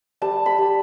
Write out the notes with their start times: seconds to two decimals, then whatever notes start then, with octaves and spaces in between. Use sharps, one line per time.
0.21 G3 A5
0.46 B5
0.58 G3